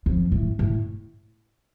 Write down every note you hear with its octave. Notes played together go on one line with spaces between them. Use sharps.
F2
A2
A2